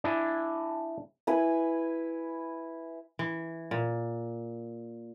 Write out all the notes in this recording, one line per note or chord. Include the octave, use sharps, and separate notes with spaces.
D4 E4 G#5
E4 B4 G#5
E3
A#2